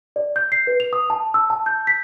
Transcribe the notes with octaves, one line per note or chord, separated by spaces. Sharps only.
D5
G6
C7
B4
F7
D#6
A5
E6
A5
G6
B6